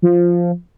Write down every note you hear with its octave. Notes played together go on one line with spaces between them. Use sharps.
F3